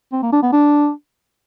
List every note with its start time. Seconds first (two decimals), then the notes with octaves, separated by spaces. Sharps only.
0.13 C4
0.23 A#3
0.33 D4
0.43 B3
0.53 D4